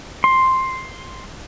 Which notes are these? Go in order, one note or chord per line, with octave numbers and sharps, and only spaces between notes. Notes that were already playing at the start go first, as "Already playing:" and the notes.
C6